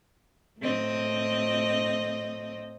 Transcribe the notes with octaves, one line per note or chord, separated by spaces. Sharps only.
A2 C4 D#5